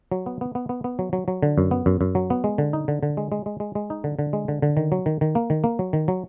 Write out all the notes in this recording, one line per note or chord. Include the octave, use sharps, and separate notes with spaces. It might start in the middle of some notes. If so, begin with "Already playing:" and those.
F#3
B3
B3
B3
B3
B3
F#3
F#3
F#3
D3
F#2
B3
F#2
F#2
F#3
B3
G#3
D3
D#4
D3
D3
G#3
G#3
G#3
G#3
G#3
D#4
D3
D3
G#3
D3
D3
D#3
F#3
D#3
D#3
A#3
D#3
A#3
F#3
D#3
F#3